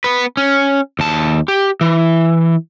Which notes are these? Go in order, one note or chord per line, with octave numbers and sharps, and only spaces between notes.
B3 B4
C#4
D#2 A5
G4
E3